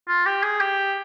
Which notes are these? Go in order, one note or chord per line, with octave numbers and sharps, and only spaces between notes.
F4
G4
G#4
G4